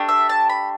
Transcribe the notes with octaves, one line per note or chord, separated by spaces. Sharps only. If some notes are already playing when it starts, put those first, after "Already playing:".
Already playing: A3 D4 G4
E5
A5
B5